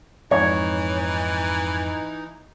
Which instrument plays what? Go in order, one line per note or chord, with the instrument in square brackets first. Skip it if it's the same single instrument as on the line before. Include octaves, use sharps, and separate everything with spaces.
[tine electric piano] F2 G#2 C#6 [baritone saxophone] E3 [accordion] D#4 [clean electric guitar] C#5